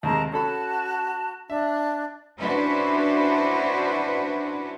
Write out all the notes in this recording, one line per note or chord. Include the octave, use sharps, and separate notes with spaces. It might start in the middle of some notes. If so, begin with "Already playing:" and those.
D#2 C3 G#3 A#4 A5 A#5
C#4 F#4 A4 A5 B5
D4 E5
C#4 D4 E4 F#4 B4 C5